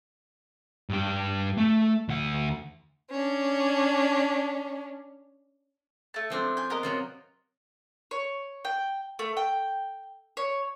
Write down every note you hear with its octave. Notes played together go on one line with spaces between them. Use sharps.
G2 G4
A3
D2 F#5
C#4 D4
A3 A5
F3 C4 D4
G#5 G6
B3 A#4 D#5
C3 F#3 F4
C#5
G5
A3
G5
C#5